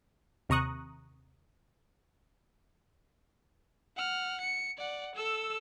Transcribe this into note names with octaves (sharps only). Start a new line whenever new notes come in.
D#2 C3 A#5 C#6 D#6 F#6
F#5 F6
C#7
D5 F#5
A4 E6